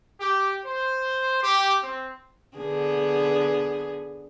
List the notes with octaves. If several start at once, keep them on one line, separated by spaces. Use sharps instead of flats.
G4
C5
G4
C4
D3 B3 G#4